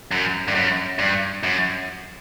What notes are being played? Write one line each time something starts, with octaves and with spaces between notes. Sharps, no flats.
F#2
G2
F#2
G2
F#2